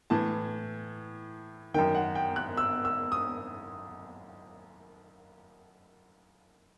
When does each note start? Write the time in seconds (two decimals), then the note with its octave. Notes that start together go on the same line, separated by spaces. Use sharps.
0.10 A2 E3 A5
1.74 F#2 D#3 G5
1.95 F#5
2.15 G5
2.36 F#6
2.57 E6
2.85 E6
3.12 D#6